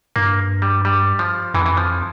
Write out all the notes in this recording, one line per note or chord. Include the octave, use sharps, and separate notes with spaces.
G2 A#3
G3
G3
F3
F2 E3
E3
F3